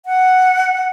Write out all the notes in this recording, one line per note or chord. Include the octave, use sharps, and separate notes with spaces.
F#5